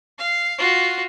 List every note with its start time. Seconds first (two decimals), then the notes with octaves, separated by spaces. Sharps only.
0.19 F5
0.59 F4 F#4